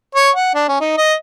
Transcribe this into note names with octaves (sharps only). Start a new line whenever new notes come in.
C#5
F#5
D4
C#4
D#4
D#5